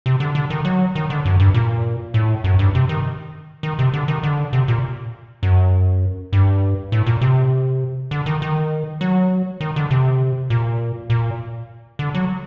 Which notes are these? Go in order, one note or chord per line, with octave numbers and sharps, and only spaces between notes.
C3
D3
D3
D#3
F#3
D#3
D3
F#2
G2
A#2
A2
F#2
G2
C3
D#3
D#3
C3
D3
D#3
D3
C3
A#2
F#2
G2
A2
A#2
C3
D3
D#3
D#3
F#3
D#3
D3
C3
A#2
A#2
D3
F#3